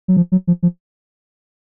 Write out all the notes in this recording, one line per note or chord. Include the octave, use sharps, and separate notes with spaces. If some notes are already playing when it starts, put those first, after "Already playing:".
F#3
F3
F#3
F3
F3